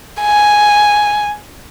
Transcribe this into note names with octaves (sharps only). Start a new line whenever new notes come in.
G#5